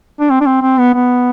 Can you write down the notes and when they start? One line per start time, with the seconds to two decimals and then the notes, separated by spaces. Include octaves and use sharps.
0.20 D4
0.30 C4
0.40 D4
0.46 C4
0.62 C4
0.79 B3
0.94 B3